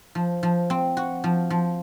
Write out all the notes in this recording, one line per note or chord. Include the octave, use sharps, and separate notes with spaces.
F3
F3
C4
F#4
F3
F3